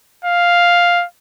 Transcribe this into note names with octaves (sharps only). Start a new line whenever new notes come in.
F5